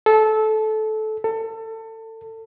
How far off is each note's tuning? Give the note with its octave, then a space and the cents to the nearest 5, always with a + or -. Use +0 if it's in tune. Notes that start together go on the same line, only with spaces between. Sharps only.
A4 -20
A4 +25